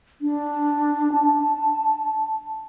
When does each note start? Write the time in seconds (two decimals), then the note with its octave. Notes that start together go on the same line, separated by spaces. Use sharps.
0.21 D4
1.12 A5